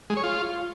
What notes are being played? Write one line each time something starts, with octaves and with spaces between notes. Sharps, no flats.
G#3
C#5
F4